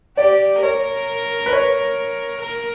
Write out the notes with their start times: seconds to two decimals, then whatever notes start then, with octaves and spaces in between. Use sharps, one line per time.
0.17 G4 D5
0.62 A#4 C#5
1.46 B4
1.53 C#5
2.42 A#4